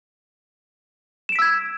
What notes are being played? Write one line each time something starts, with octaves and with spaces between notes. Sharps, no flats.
E6 G#6 B6 D7 E7